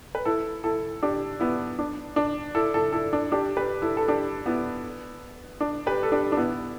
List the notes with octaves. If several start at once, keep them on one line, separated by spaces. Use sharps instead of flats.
B4
E4 A4
E4 A4
D4 G4
B3 E4
D4
D4
E4 A4
E4 A4
E4 A4
D4
D4 G4
G4 B4
E4 A4
A4
D4 G4
B3 E4
D4
G4 B4
A4
D4 G4
D4
B3 E4